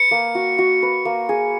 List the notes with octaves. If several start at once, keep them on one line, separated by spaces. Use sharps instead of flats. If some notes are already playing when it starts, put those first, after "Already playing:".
Already playing: B4 C#7
A#3
F#4
F#4
B4
A#3
G#4